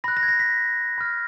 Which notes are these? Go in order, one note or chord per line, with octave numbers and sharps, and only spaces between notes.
B5 F#6 A#6
A#6
G#6
A#6
B6
B5 F6